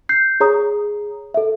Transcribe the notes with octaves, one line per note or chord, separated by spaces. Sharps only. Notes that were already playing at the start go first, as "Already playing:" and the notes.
G6 C7
G#4 C#5 A#5 D#6
A4 E5